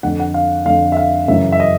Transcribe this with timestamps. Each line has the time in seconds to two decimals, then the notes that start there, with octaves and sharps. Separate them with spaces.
0.03 F2 D3 F#5
0.20 F#5
0.34 F5
0.65 F2 D3 F5
0.92 E5
0.97 F5
1.28 F#2 C#3 E3 E5
1.52 E5
1.60 D#5